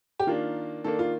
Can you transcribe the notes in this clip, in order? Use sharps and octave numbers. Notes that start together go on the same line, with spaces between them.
G4
D#3 A#3 D4 F4
D#3 A#3 D4 A4
F4